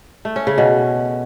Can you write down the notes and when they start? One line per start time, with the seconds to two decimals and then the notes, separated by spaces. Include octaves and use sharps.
0.25 A3
0.36 C#4
0.47 C#3
0.58 B2